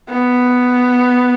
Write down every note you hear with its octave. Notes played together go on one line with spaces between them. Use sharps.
B3